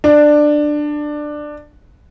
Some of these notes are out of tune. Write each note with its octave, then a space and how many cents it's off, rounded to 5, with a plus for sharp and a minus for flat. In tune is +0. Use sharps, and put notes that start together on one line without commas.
D4 +15